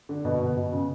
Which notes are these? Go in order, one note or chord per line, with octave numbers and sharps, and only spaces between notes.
D3
B2
B2
B2
C#3